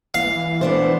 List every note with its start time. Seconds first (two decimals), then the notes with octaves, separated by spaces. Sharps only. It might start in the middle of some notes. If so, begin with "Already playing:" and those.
0.14 E3 F5
0.61 B3 D4 C5